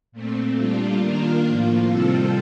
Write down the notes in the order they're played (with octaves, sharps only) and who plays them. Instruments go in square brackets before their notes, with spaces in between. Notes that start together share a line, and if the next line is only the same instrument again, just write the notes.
[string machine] A#2 A3 C4
A#2 G3 D4 F4
D#3 A#3 D4 F4 A#4
A2 F3 A#3 F4
C3 D#3 G3 C4 F4 A4